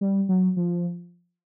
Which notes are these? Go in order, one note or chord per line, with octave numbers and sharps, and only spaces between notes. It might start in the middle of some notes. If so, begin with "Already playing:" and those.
G3
F#3
F3